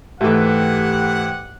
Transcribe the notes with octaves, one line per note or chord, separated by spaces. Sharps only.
G#2 E3 A3 G4 B4 F#5